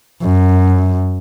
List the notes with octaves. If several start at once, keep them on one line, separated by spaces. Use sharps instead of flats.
F#2